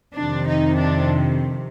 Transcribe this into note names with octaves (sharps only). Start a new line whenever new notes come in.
F2 C3 D#3 D4
D#4
D4